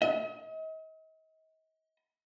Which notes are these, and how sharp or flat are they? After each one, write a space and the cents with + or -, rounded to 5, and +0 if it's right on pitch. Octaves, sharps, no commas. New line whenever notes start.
D#5 +40